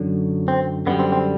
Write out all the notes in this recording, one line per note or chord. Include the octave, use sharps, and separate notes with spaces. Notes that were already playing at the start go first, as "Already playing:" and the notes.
Already playing: F#2 D3 F#3
C4
F#2 D3 G3 B3
C4
C4